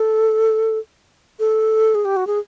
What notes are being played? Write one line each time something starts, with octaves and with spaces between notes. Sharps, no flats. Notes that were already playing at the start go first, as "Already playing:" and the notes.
Already playing: A4
A4
G#4
G4
F#4
G#4